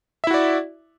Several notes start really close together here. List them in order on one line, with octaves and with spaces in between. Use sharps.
E5 E4 F#4 D5